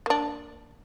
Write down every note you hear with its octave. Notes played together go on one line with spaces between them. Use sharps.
A#3 D4